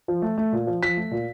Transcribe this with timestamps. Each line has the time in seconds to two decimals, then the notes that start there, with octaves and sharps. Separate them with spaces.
0.08 F3
0.22 A3
0.38 A3
0.53 A#2
0.67 F3
0.82 F3 B6
0.97 A3
1.11 A#2